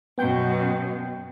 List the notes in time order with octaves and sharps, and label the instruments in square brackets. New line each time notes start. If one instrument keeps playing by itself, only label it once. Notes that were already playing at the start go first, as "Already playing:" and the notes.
[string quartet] F#2 B2 [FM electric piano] B3 G5 G6